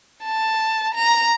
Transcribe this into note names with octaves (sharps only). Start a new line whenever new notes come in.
A5
A#5